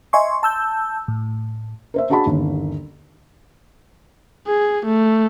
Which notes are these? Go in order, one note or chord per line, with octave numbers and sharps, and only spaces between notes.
D#5 E5 G#5 C6 C#6
A5 E6 G6
A2
A#4 C5 E5
D4 F#4 G#4 F#5 A5 B5
G1 D#2 C#4
G#4
A3